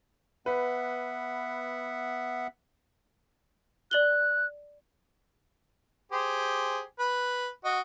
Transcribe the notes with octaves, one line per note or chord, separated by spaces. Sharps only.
B3 B4 E5 F#5
D5 F#6 F#7 G7
G4 G#4 C5
B4
F#4 D#5